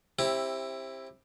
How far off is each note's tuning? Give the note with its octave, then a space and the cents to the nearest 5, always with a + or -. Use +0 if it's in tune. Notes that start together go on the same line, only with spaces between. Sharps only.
C4 +25 E4 +0 G4 +10